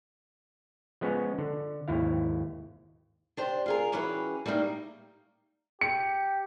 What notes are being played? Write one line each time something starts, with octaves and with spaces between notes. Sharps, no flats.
F3 G#3 B3 C#4 C#5
D3
G#1 D#2 E4 F5
D4 G4 C5
F4 G#4 A#4
E3 G3 C#4 F#4 G#4 B4
G3 A3 A#3 D#4
G4 C#7